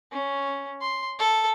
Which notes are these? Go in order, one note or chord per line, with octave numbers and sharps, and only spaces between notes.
C#4
C6
A4